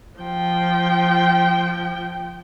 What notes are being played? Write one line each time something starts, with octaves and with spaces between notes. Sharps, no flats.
F3 G5